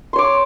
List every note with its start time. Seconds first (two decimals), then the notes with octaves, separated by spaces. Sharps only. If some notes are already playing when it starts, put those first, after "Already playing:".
0.13 C6
0.16 C#5
0.18 D6